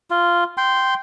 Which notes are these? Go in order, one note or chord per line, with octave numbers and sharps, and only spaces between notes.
F4
G5 C6